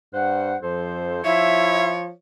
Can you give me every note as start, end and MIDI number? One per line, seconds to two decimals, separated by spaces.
0.14 0.54 43
0.14 0.56 72
0.14 0.56 78
0.62 1.19 41
0.62 1.23 53
0.62 1.23 69
0.62 1.23 72
1.24 2.09 53
1.24 1.94 64
1.24 2.13 73
1.24 1.90 76